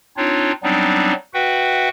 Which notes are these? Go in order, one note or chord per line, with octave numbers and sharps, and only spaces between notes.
C4 D4 D#4 F4 C#5
F#3 G3 B3 C4 D4 D#4
F#4 B4 E5 F#5 G5